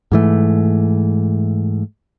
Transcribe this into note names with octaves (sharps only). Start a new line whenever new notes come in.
G#2 E3 A3